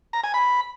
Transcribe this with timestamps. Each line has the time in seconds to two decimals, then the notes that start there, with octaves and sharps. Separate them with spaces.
0.13 A#5
0.24 G#5
0.34 B5